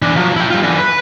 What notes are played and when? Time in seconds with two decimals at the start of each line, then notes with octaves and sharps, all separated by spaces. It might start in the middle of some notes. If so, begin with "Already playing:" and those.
0.02 E3 D4
0.16 F3 F#3
0.37 E4 G5
0.50 G3 F4
0.63 D3 E3
0.78 B4